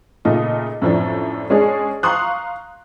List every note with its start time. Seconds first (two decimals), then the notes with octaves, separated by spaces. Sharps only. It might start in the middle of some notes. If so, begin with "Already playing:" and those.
0.25 A#2 C#3 A3 D#4 F4
0.82 F#2 A2 F3 C4 D4
1.50 G#3 C#4 D4 G#4
2.03 F5 A#5 C6 C#6 D#6 F#6